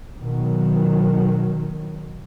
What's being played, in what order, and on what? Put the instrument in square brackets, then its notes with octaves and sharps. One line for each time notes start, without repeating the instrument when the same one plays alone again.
[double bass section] B2 D#3 F#3